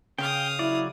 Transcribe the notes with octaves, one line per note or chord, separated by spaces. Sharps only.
C#3 F5 G5 D#6
F#3 E4 D5